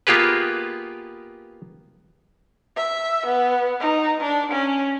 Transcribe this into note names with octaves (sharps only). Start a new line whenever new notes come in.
A#3 B3 F4 G4 G#4 B4
E5
B3
D#4
D4
C#4